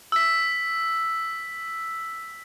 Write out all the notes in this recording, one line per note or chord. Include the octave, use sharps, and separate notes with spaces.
E6 B6